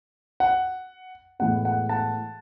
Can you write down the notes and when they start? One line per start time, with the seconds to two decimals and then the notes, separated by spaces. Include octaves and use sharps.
0.40 F#5
1.39 A2 E3 G#3 B3 F#5
1.65 F#5
1.89 F#5 A5